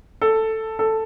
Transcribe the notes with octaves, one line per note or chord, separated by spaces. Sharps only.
A4
A4